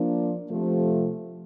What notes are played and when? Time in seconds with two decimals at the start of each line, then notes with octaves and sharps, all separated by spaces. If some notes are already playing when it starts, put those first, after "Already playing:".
Already playing: F3 A#3 D4
0.50 C3 F3 A3